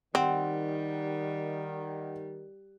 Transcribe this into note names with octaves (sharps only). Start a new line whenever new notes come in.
D#3 G3 C4 F#5